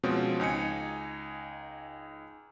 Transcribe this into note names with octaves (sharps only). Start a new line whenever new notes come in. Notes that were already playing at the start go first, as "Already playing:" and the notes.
B2 F3 G#3 C4 C#4
C#2 D#4 G#5 C#7